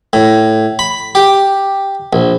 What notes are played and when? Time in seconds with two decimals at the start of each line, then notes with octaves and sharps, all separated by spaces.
0.13 A2
0.79 B5
1.15 G4
2.13 A#1